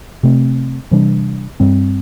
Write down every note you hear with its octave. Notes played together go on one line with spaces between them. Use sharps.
C3 A3 C4
C3 E3 G3 D4
G2 G3 C4